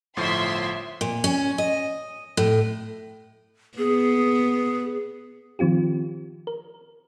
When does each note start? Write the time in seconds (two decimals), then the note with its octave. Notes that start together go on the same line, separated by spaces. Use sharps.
0.17 G1 A2 F3 E5 C6
1.01 A#2
1.24 C#4
1.58 D#5
2.37 A2
3.78 B3 G#4
5.59 D#3 F3 C4 F4 G4
6.47 A#4